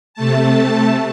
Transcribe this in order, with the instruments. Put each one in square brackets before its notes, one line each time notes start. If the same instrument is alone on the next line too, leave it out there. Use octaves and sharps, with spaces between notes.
[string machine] C3 A3 A5